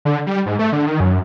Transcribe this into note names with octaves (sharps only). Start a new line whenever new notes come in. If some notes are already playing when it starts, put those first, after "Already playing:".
D3
G3
G#2
A3
D3
D#3
F#2